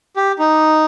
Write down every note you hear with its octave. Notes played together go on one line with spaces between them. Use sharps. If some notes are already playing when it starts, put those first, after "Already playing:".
G4
D#4